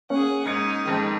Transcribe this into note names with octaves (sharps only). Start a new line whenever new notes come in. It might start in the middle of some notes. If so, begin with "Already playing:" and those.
A#3 C#4 G#4 F#5
G#2 D#4 G#6 C#7
F2 G#2 D#3